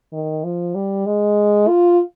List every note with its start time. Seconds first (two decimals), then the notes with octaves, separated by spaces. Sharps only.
0.13 D#3
0.44 F3
0.75 G3
1.06 G#3
1.68 F4